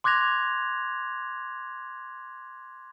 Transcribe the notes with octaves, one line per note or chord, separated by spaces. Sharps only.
C6 D6 F#6 G#6 A#6 F7